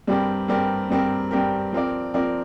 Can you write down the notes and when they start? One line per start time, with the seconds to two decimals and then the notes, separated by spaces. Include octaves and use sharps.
0.07 G2 G3 C4 G4 A#4
0.48 G2 G3 C4 G4 A#4
0.90 G2 G3 C4 G4 A#4
1.31 G2 G3 C4 G4 A#4
1.73 F3 C4 A#4 D5
2.14 F3 C4 A#4 D5